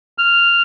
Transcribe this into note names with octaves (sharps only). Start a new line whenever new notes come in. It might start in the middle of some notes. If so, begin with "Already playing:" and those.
F6